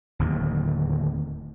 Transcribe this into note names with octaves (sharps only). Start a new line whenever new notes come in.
D1 D#2